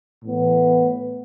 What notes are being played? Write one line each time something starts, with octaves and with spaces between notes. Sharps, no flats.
A2 E3 B3